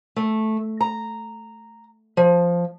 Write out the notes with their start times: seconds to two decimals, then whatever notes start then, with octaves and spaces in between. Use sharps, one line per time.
0.16 A3
0.81 A#5
2.17 F3